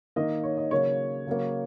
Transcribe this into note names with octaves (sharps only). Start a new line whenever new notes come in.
D#3 A#3 D#5
C#5
D#5
C#3 F#3 A#3 C#5
C#3 F#3 A#3